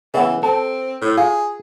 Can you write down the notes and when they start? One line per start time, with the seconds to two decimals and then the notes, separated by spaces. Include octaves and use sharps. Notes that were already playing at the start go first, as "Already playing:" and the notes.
0.14 C#3 E3 B3
0.43 C4 A4
1.02 A2
1.17 F4 G#4